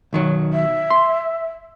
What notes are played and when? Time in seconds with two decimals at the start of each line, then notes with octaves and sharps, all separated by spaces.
0.13 B1 D#3 F#3
0.53 E5
0.90 C6